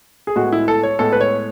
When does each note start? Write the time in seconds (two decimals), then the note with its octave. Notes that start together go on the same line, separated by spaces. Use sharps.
0.27 G#4
0.36 A2 G#3 B3 F#4
0.52 E4
0.68 A4
0.83 C#5
0.99 A2 G#3 B3 A4
1.12 B4
1.21 C#5